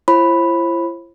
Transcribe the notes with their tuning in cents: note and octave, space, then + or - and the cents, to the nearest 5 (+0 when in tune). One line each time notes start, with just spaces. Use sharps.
E4 +45 C5 +40 B5 +0